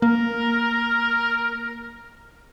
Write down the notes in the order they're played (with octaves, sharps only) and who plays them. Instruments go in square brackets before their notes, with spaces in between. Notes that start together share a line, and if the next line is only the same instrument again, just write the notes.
[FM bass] A#3 [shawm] A#4